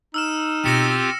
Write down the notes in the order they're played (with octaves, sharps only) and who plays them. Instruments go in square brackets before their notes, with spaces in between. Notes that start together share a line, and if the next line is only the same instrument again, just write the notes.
[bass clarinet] D#4 [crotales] E6 F6 E7
[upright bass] B2 B3 [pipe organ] C4 F4 G4 [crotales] A#6 C#7 E7